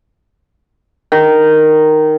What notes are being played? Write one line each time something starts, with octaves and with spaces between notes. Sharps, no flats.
D#3